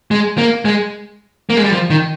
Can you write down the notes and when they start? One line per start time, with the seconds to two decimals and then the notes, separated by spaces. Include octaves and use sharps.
0.11 G#3
0.38 A#3
0.65 G#3
1.50 A#3
1.57 G#3
1.64 G3
1.72 F3
1.90 D#3